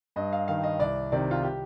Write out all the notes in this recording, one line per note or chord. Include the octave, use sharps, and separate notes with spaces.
G2 D#5
F5
D#3 F5
D#5
C2 D5
C3 D#3 D5
F4
G4